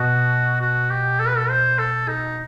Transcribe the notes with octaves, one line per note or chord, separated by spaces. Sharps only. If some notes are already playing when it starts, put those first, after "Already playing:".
Already playing: B2 F#4
F#4
G4
A4
B4
A4
C5
A4
D#4